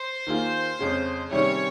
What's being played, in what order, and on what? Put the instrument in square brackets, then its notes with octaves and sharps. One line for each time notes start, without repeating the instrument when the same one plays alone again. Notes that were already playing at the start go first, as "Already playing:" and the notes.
Already playing: [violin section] C5
[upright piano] D#3 A#3 F4 G#4
F2 C#3 G#3 C#4
[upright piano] C3 D#3 G3 C#4 G#4 [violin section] C#5